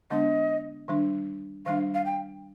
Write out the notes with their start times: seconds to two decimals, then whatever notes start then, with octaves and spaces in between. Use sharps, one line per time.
0.10 D3 G#3 B3 D4 D#5
0.88 D#3 G3 D4
1.66 D#3 G3 D4 F5
1.94 F5
2.05 G5